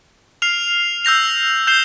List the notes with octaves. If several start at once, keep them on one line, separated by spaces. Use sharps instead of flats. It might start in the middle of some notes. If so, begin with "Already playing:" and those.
F6 C7 F7
E6 G6 A#6 F7
G6 C7 E7 G7